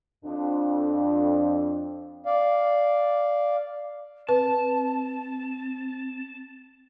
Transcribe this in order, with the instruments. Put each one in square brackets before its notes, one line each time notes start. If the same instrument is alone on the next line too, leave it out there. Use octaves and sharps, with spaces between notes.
[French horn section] F2 D4
[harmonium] D5 F5
[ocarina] C4 [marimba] B4 [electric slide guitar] A5